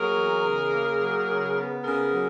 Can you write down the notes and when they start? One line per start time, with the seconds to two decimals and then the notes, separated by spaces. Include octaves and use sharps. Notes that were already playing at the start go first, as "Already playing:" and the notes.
Already playing: F#3 A#3 G#4 A#4
0.15 E2
0.43 C#3
0.71 A#3
1.00 F#3
1.28 C#3
1.56 B3
1.83 C#3 G#4 A#4
2.11 F#3